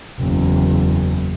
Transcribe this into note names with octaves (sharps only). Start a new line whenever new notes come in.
F#1 E2